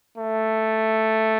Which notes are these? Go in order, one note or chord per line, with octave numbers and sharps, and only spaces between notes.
A3